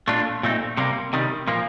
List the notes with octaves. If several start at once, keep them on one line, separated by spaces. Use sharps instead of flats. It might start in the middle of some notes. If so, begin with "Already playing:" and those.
A#2 A3 D4 F4
A#2 A3 C4 D#4
C3 G3 A#3
C3 D#3 G3
A#2 F3 A#3